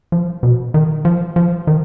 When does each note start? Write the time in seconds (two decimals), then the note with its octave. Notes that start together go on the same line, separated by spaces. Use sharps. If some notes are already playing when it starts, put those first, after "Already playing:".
0.12 F3
0.43 B2
0.74 D#3
1.05 F3
1.36 F3
1.67 D#3